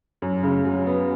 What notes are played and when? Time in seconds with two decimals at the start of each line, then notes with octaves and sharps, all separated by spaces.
0.22 F#2
0.43 C#3
0.65 F#3
0.86 B3